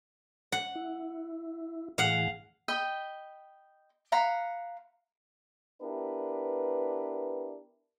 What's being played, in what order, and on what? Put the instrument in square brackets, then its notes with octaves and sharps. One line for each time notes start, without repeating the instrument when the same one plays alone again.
[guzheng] F#5
[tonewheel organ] E4
[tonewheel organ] A2 E3 G#4 [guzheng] F5 F#5
[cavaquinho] D#5 G5 B5
F5 F#5 A#5 B5
[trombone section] B3 D4 E4 G4 A#4 B4